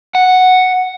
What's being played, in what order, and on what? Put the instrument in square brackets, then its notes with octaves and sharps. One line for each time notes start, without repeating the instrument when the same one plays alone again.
[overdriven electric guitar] F#5